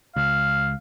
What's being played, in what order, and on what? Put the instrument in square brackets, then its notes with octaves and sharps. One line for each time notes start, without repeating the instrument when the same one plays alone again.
[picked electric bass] C#2 [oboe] F5